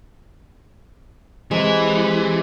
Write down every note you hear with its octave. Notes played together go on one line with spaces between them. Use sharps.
C3 E3 G#3